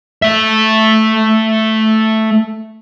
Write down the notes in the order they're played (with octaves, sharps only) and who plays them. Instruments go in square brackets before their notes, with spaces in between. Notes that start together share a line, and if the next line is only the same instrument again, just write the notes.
[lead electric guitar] A3 E5